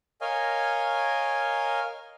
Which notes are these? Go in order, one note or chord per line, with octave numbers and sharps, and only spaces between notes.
A#4 C#5 D#5 F5 G#5